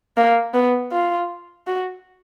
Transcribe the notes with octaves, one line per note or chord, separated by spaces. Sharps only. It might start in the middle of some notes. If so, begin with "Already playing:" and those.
A#3
B3
F4
F#4